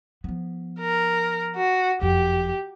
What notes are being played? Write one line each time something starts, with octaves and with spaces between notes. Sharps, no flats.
F3 B3
A#4
F#4
F#1 F2 G4